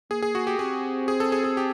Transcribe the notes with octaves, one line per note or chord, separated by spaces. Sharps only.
A#3 G#4
G#4
F#4
G4
C4 G#4
G#4
A4
G#4
G#4
G4